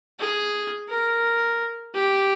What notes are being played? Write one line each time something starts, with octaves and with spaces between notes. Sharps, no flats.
G#4
A#4
G4